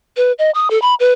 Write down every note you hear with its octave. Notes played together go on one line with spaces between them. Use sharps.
B4
D#5
D#6
A4
B5
B4